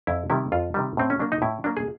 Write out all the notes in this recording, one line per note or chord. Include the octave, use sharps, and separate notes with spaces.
F2 E4
C3 D#3 G3 E4
F2 F4
C3 D#3 G3
A2 C4
C#4
F#3 A#3 D4
D#4
A2 E4
F#3 A#3 D4
G#4